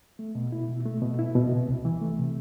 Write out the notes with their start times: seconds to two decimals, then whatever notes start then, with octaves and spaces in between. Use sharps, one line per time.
0.19 A3
0.35 B2
0.52 E4
0.69 B2
0.86 A3
1.02 B2
1.19 E4
1.35 B2
1.52 C3
1.69 C2
1.85 E3
2.01 A3
2.19 C3